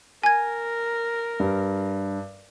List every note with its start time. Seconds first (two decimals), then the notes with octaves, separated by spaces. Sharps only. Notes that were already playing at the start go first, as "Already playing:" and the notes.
0.23 A#4 G#5 G#6
1.40 G2